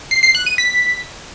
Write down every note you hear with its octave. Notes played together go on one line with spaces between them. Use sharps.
C7
C7
F#6
D#7
B6